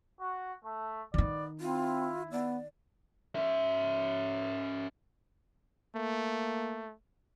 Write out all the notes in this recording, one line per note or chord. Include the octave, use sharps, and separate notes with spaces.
F#4
A3
D#3 B3 D#4 D5
C4 E4 F4
B3 D5
C#4 E5
A3 A#3